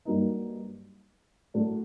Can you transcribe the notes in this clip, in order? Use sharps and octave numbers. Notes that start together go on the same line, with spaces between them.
G2 F#3 A#3 D#4
A2 F#3 A3 D4